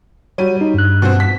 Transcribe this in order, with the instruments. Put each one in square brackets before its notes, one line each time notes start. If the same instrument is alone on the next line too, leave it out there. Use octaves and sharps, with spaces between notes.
[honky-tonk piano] G3 D#7 [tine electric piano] F#4 C#5
[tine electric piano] D#4
G2 F#6
[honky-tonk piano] B2 C4
B6